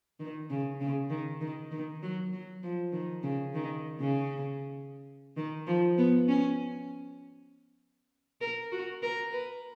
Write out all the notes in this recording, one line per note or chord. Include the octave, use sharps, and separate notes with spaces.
D#3
C#3
C#3
D#3
D#3
D#3
F#3
F#3
F3
D#3
C#3
D#3
C#3
D#3
F3
B3
C#4
A#4
F#4
A#4
B4